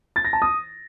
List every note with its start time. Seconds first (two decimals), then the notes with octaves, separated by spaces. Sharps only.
0.16 A6
0.25 A#6
0.33 A5
0.42 D#6